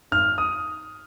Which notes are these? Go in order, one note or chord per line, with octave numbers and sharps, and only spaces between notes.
G#1 F6
D#6